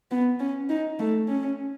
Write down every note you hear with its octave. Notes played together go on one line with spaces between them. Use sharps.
B3
C#4
D#4
A3
C#4